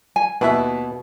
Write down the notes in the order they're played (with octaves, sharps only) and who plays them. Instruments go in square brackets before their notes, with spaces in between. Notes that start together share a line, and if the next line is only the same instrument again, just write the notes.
[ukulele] G#5
[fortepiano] D#2 E4 E5 [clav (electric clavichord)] B2 [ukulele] B4